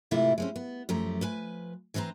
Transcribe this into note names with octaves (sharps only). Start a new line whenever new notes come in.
G#2 C3 E3 A3 E4 F4
G#3 C4 C#4
B3
F#2 F3 A3 G4 A#5
F3 B4 G#5
E3 C4 B4 C5 A#5